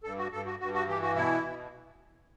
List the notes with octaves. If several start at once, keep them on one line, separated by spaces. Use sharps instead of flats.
G2 A4
F#4
G2 A4
F#4
G2 F#4
F#4
E3 G4
F#4
B2 E4
B2